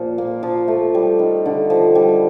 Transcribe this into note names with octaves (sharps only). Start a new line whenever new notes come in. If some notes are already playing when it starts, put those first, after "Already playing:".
Already playing: A#2 F3 F4
A#3
F3
A3
G3
D#3
D3
F3
G3